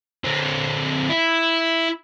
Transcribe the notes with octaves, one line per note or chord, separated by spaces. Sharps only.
D3 C4
E4